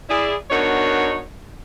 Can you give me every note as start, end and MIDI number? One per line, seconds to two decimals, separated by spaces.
0.10 0.34 64
0.10 0.34 68
0.10 0.34 74
0.50 1.21 59
0.50 1.21 62
0.50 1.21 63
0.50 1.21 66
0.50 1.21 70
0.50 1.21 73